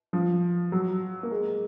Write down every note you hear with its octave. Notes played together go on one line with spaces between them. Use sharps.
F3
F#3
A#3
G#3